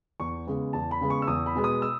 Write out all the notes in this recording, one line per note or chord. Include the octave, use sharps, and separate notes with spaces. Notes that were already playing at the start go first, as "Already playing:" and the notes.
E2 C#6
C#3 G#3 B3
E2 A5
B5
C#3 G#3 B3
C#6
E6
E2 D#6
B5
B2 G#3 B3
D#6
E6